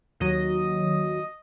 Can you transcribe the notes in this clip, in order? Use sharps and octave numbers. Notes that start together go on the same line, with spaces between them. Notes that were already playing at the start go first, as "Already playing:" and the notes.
D#2 F#3 D#5